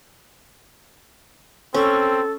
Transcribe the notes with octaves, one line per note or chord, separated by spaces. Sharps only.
C4 C#4 A4